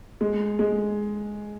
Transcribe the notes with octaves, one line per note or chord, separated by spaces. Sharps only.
G#3
G#3